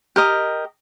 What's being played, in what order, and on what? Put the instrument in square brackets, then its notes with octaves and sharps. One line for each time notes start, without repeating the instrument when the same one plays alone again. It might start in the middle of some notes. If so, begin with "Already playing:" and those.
[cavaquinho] G4 A#4 D#5